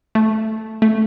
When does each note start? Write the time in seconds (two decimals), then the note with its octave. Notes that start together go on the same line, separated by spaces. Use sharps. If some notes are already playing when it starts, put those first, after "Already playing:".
0.15 A3
0.82 A3